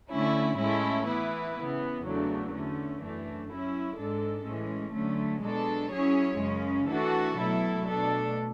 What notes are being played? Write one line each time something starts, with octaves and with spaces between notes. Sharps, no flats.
D3 A3 C#4 E4
A2 G#3 C#4 E4 A4
E3 B3 E4 B4
C#3 E3 B3
E2 C#3 F#3 A3 D4
D3 A3 C#4
F#2 E3 A3 D4
F#3 C#4 E4
G#2 G#3 D4 A4
A2 E3 G#3 C#4
D3 F#3 A3 C#4
B2 G#3 D4 A4
F#3 C#4 E4 G#4 C#5
F#2 C#3 G#3 C#4
E3 A3 D4 F#4 A4
B2 F#3 A3 E4 A4
B2 A3 D4 A4